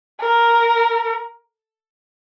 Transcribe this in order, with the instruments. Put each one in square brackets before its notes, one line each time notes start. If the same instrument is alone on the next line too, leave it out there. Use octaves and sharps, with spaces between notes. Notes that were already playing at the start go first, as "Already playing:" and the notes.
[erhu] A#4